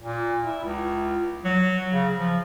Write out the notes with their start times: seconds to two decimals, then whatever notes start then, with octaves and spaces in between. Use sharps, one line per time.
0.02 A#2
0.43 E4
0.64 C#2
1.45 F#3
1.92 C#3
2.15 F3